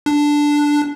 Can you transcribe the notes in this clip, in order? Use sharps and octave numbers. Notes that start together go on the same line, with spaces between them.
D4